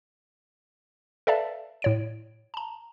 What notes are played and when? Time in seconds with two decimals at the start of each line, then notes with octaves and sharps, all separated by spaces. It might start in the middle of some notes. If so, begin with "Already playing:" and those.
1.27 A4 B4 D5 E5 F5 A5
1.82 A2 C#5 D7
2.54 A5 A#5